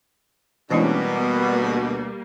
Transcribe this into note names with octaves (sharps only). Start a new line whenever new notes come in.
B2 E3 G3 G#3 A#3 C#4 D4 E4
B3
D2